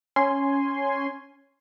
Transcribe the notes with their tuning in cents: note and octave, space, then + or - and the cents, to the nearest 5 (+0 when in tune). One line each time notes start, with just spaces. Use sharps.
C#4 +0 G#5 +0 C6 +0